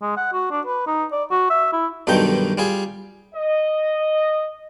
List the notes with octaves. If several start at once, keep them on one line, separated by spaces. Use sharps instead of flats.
G#3
F#5
F#4
D4
B4
D#4
D5
F#4
E5
E4
B1 G2 D3 D#3 D#4 G5
G3 F4 G#4
D#5